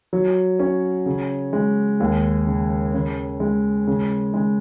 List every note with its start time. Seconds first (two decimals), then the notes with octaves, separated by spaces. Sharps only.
0.13 F#3
0.59 C#4
1.06 C#3
1.53 G#3
2.00 D#2
2.47 C#3
2.94 C#3
3.40 G#3
3.87 C#3
4.34 G#3